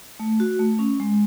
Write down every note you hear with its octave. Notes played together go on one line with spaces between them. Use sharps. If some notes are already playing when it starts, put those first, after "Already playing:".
A3
F#4
A3
C#4
G#3